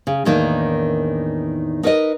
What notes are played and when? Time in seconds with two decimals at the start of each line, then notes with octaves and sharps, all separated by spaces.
0.07 C#3
0.25 E2 A2 D#3 A#3 D4 D#4
1.83 D#4 A#4 B4 D5 D#5